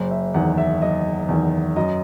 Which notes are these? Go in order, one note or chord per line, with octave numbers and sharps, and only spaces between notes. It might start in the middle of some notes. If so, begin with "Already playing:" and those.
Already playing: F#1 C5
E5
E2 D#3 F#5
E5
F#1 D#5
E2 D#3
F#2 D#5